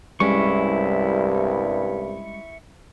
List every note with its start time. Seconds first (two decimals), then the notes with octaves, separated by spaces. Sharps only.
0.20 C2 G2 G3 G#3 C#4 E4 C#6